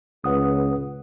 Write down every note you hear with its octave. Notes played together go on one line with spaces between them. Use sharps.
C#2 B4 F#5 D#6